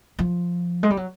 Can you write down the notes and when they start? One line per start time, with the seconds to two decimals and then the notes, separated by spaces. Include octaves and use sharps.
0.19 F3
0.83 G#3
0.90 G3
0.97 F#3